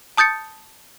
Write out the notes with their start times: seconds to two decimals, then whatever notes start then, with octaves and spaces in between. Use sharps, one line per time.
0.17 A5 D#6 G6 A6 C#7